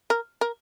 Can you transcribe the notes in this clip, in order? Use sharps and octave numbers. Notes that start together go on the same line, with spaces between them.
A#4
A#4